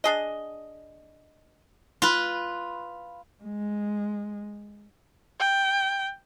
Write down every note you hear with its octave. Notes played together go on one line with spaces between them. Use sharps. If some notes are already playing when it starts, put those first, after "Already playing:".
D4 G#4 D#5
F4 B4
G#3
G5